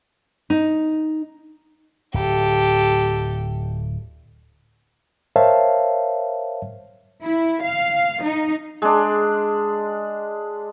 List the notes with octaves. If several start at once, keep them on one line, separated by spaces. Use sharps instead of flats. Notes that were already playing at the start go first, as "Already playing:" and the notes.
D#4
D1 G4 A4
A#4 C5 C#5 E5 F5 A5
E4
F5
D#4
G#3 D4